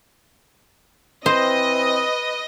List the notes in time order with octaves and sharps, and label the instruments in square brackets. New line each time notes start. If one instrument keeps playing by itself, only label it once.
[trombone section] E3 C4 [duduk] B4 [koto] C5 [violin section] D#5 A#6